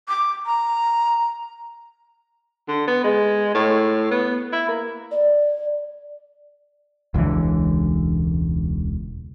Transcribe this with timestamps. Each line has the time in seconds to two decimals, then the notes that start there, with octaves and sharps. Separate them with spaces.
0.08 D6
0.46 A#5
2.68 D3
2.88 B3
3.04 G#3
3.54 A2
4.11 B3
4.53 E4
4.68 A#3
5.11 D5
7.14 E1 C#2 D3 E3